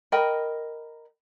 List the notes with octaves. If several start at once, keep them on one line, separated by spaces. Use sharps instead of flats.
A#4 D#5 G5 B5